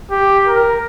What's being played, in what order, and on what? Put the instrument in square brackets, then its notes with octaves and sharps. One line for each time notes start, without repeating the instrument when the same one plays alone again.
[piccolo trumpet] G4
A#4